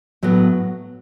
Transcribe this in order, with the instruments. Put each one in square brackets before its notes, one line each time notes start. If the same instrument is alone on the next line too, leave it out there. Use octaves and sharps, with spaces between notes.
[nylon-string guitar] A2 F#3 B3